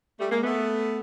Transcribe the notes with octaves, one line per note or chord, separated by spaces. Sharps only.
G3 A3
G#3 A#3
A3 B3